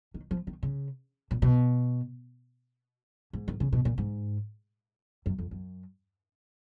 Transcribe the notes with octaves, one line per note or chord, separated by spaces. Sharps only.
D#3
F3
D#3
C#3
A#2
B2
G#2
D#3
C#3
B2
A#2
G#2
F#2
F2
F#2